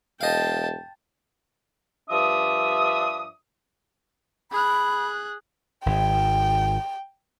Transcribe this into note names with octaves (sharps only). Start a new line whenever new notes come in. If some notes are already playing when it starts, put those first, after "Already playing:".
E1 D#5 F5 G5 A5
G2 F3 D4 E5 D#6
G#4 B5 F#6
G#1 G5